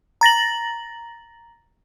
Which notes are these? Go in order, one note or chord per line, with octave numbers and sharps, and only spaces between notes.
A#5 A6 A#6 F#7